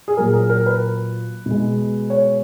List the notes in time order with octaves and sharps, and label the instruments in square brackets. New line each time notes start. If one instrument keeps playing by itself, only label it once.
[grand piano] G#4
A#2 F#3 A#4
A#4
A#4
B4
B2 G#3
C#5